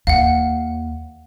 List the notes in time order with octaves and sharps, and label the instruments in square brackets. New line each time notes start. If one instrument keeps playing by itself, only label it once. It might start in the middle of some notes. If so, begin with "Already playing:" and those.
[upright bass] D#2 [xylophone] F5 F#5